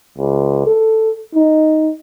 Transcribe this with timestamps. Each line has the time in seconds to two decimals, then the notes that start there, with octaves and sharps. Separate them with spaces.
0.17 C#2
0.66 A4
1.34 D#4